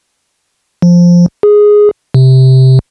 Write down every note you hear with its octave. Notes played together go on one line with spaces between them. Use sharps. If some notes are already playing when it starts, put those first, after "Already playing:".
F3
G#4
C3